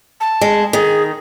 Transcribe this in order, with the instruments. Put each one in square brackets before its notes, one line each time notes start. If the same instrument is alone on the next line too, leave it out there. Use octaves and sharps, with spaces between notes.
[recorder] A5
[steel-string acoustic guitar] G#3
[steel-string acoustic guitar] D#3 [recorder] G#4